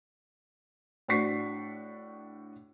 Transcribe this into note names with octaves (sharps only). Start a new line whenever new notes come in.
A2 D4 F#4 C#6 B6 C7